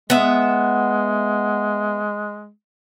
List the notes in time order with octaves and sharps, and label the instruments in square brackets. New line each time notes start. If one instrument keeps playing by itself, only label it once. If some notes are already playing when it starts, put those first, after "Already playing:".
[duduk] G#3 [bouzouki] B3 E5